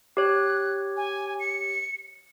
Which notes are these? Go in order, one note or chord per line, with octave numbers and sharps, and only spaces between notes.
G4 C#5 F#6
G#5
C#7